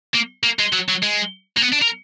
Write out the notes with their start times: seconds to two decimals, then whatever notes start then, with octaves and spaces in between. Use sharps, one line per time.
0.14 A#3
0.44 A#3
0.59 G#3
0.73 F#3
0.89 F#3
1.03 G#3
1.57 A#3
1.62 B3
1.72 D4
1.82 A#4